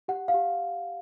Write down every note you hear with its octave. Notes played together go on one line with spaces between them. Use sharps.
G4 F#5
F5
G4